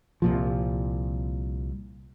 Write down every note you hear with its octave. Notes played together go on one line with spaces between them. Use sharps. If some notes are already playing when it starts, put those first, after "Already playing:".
C2 A#2 F3